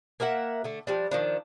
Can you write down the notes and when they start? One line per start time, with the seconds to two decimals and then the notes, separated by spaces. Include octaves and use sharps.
0.20 A#3 A#4 E5 F#5
0.64 D3 A3
0.87 F3 G3 D4
1.11 D#3 F3 D4